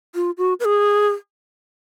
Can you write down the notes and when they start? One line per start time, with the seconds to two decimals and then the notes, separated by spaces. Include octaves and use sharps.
0.15 F4
0.38 F#4
0.60 B4
0.65 G#4